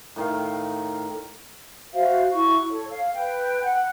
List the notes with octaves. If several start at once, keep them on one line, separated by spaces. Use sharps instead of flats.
A2 D#3 F5
F#4 C5 E5 F5
E4 F#4 C#6
A4 C#5
F5
B4 G5
F#5